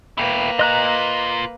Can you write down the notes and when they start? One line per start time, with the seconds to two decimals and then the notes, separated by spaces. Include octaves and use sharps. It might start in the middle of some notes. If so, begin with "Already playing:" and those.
0.18 A#3 E4 B4 G5
0.59 F4 D#5 A#5 F#6